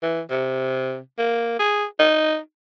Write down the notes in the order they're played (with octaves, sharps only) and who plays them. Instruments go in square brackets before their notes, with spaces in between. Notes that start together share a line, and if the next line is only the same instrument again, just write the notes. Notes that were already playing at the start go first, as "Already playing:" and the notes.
[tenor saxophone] E3
C3
A#3
G#4
D#4